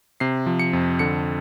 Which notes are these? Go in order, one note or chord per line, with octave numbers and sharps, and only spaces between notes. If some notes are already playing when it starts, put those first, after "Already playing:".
C3 C7
F3
C#7
F2
D3 C#7